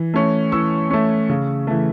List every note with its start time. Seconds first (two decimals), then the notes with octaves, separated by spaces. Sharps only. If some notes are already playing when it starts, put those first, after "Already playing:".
Already playing: E3
0.14 A3 C#4
0.52 E3 C#6 E6
0.91 A3 C#4
1.29 C#3
1.67 E3 A3